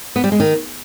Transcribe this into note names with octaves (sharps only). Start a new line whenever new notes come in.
B3
G3
G#3
D#3